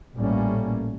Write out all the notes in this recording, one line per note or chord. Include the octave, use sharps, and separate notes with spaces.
A1 A#2 G3 A3 A#3 C#4